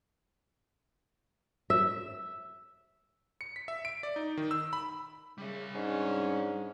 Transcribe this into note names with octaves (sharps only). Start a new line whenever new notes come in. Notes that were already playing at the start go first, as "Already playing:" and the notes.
E5
C#7
B6
E5
D7
D5
D#4
D#3
E6
B5
C#3 G3 E5
G#2 C#4 D4